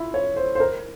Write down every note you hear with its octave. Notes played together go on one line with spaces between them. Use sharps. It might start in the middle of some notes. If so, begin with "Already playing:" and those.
Already playing: E4 F4
C#5
C5
C5
A#4